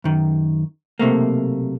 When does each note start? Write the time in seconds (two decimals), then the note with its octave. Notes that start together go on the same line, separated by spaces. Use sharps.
0.04 F#2 D#3
0.99 B1 C3 A3 A#3